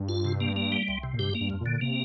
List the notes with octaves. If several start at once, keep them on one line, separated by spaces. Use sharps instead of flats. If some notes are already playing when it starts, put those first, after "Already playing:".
Already playing: G2
F4
C3
A#3
A#3
G3
C2
C3
A#2
G2 G4
A#3
G2
F2
A#2
D3
C3 A#3